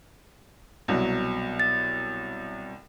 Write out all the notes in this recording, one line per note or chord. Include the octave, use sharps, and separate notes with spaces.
C2 B2 F#3
A6